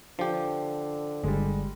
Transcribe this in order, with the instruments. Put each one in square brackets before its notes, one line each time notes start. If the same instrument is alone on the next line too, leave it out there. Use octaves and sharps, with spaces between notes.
[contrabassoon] D3 [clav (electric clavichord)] F3 G4
[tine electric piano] G1 [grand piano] G3 G#3